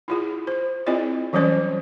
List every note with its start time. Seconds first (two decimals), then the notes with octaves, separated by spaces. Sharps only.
0.08 E4 F4 G#4
0.47 C5
0.86 C4 E4 F4 G#4 D5 D#5
1.33 E3 F#3 G3 C#4 C5 D5